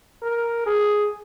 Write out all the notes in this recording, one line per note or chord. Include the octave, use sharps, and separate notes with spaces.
A#4
G#4